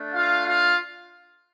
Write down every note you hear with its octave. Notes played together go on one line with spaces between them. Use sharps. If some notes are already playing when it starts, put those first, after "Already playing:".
Already playing: A3 D4
F4 F5
F4 F5